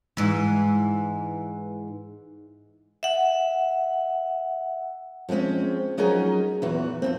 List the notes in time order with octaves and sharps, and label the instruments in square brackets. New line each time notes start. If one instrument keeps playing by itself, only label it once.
[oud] G#2 E3
[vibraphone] E5 F#5
[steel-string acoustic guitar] F3 G3 G#3 C4 C#4
F3 F#3 C#4 D#4 G#4 A#4
E2 A#2 E3 F#4
F2 G#2 C4